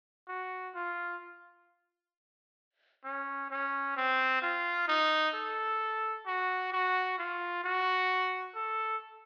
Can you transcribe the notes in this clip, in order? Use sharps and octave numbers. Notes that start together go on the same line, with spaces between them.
F#4
F4
C#4
C#4
C4
F4
D#4
A4
F#4
F#4
F4
F#4
A4